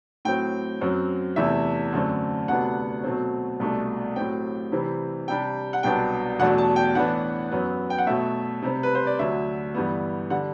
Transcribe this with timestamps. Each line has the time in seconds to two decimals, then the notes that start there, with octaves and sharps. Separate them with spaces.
0.25 A2 F#3 C4 G5
0.81 F#2 F#3 C4
1.36 E2 C3 E3 A3 E5
1.93 F#2 D3 A3 C4
2.48 D2 C3 F#3 B3 D4 F#5
3.04 B2 F#3 A3 C4
3.60 C2 B2 A3 D4
4.16 A2 F#3 C4 G5
4.72 C3 E3 G3 C4
5.28 C3 G3 D4 G5
5.73 F#5
5.83 C2 B2 F#3 B3 D4 G5
6.39 E2 B2 F#3 A3 D4 F#5
6.58 A5
6.76 G5
6.95 A2 E3 B3 D4 F#5
7.51 F#2 F#3 B3
7.90 G5
7.98 F#5
8.07 B2 F#3 A3 E5
8.62 C3 G3 C4
8.83 B4
8.95 C5
9.07 D5
9.19 D2 D3 F#3 E5
9.74 G2 E3 G3 B3
10.30 D3 G3 F#5